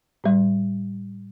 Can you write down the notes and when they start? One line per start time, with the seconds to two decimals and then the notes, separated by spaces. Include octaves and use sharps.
0.24 A2 G3